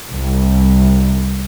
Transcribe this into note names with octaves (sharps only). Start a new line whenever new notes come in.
C2